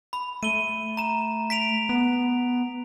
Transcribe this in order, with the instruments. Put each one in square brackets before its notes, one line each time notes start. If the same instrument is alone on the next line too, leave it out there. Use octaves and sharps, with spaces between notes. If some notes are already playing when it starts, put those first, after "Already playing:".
[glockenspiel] B5
[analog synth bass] A3 [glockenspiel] D#7 G7
[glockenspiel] A#5 E7
B6 D7 F7
[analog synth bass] B3